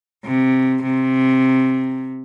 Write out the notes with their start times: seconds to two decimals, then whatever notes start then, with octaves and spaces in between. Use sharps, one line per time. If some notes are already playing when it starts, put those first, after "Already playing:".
0.25 C3
0.83 C3